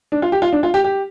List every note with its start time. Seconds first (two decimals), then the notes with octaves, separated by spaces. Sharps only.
0.12 D4
0.22 F4
0.32 G4
0.42 F4
0.53 D4
0.63 F4
0.74 G4
0.84 G4